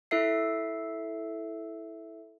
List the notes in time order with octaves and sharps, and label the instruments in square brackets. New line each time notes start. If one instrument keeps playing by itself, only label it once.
[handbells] E4 A4 E5 C7